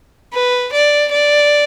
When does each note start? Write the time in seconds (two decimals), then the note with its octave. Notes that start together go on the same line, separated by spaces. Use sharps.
0.33 B4
0.72 D5
1.11 D5